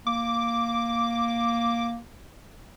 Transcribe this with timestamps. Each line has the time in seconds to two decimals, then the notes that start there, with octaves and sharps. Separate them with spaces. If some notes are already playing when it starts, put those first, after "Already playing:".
0.07 A#3 D6